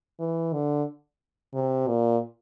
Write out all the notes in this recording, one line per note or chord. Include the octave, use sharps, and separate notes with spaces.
E3
D3
C3
A#2